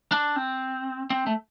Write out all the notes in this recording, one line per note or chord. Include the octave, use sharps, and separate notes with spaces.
D4
C4
C4
A3